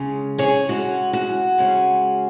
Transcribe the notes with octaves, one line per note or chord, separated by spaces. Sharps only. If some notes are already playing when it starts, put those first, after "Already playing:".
Already playing: C#3 G#3 C#4
G#4 C#5
C#3 G#3 C#4 F#4
F#4
C#3 G#3 C#4